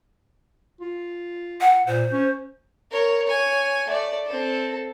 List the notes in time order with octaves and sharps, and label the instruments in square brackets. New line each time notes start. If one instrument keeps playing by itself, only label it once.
[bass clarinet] F4
[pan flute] F#5
[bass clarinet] A#2 [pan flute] C5
[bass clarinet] C#4
[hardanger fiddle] A#4 C#5
C#5 G#5
A3 D5
C4 A4